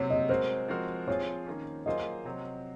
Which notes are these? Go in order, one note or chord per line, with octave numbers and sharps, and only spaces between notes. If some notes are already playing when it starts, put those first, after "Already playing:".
Already playing: C3 F#3 C4 C#5
D#5
G#3 C4 F#4 A#4 C5
F3 G#3 C4 F#4 A#4
F3 C4 F4 G#4 C#5
D#3 A#3 C#4
F#3 A#3 F4 G#4 C5 D#5
C3 F#3 C4